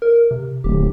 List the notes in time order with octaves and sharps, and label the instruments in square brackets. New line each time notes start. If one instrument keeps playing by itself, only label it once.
[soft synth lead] A#4
C3
[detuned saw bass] D1 [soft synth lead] G4